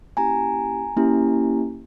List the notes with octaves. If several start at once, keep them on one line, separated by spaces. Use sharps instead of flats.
A#3 C#4 E4 G4 G#5 A#5
A#3 C#4 E4 G4